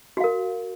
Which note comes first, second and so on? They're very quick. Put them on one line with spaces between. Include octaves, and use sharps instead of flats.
F#4 F5 A#4